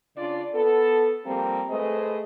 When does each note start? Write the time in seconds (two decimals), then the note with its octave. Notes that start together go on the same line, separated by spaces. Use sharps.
0.18 C#3 D4 F4 D5
0.54 B3 A4
1.26 F3 G3 A#3 C4
1.70 G#3 A3 G#4 B4 C5 D#5